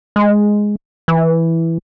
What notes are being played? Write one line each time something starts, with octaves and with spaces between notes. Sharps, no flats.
G#3
E3